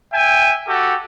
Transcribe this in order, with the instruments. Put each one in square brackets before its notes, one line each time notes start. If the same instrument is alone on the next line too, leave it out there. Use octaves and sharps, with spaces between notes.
[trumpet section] E5 G5 G#5
F#4 G4 A4